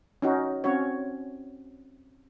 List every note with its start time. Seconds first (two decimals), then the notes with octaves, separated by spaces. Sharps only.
0.22 C#4 D#4 F#4
0.64 C4 C#4 F#4 C#5